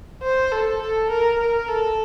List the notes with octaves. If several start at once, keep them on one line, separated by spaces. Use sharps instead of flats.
C5
A4
A4
A#4
A#4
A4